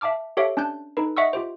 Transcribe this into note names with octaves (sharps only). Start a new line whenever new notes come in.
E5 F5 A5 D6 F6
G4 A4 C#5 E5 F5
C#4 D4 A5 F#6 G6
D#4 A4 B4
D#5 E5 F#5 C#6 E6
F4 G4 C5